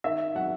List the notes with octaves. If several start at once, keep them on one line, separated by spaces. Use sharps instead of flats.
D#3 E5
F#3 F#5